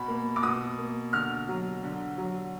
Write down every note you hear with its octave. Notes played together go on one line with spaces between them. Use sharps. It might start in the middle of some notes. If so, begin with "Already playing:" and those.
Already playing: B2 B5
A#3
D6
B2 D#6
A#3
D3 F6
F#3
D3
F#3